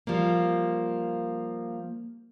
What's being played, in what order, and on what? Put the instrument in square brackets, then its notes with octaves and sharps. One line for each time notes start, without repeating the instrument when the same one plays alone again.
[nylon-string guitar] F3 G3 A#3